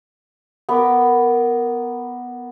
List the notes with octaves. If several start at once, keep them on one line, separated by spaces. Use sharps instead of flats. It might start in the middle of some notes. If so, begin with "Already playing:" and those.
B3 A#4 B5 D6